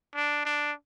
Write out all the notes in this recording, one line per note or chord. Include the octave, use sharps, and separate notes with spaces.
D4
D4